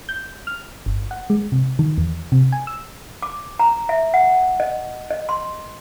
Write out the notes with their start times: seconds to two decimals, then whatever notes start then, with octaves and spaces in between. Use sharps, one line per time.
0.09 G6
0.47 F6
0.86 G1
1.11 F#5
1.30 G#3
1.52 C3
1.79 D#3
1.98 E2
2.32 C3
2.52 G#5
2.67 E6
3.23 D6
3.60 A#5
3.89 E5
4.14 F#5
4.60 D#5
5.11 D#5
5.29 C6